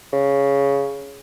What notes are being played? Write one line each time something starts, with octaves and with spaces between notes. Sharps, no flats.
C#3